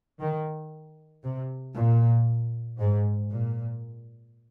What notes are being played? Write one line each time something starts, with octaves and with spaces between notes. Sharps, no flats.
D#3
C3
A#2
G#2
A#2